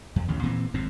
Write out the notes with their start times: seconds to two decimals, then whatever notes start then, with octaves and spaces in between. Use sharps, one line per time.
0.16 F2
0.28 A1 D#2 C#3
0.43 A#2 E3 C4
0.74 G#1 F#2 A2 C4